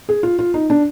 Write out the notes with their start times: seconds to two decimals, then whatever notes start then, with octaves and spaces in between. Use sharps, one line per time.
0.09 G#4
0.23 F4
0.39 F4
0.54 D#4
0.70 D4